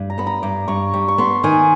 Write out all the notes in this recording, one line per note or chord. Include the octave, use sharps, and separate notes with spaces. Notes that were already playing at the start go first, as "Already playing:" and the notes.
Already playing: G2
A#5
B3 B5
A#5
G2 D6
G2 C#6
G3
C#6
B3 C6
D#3 G#5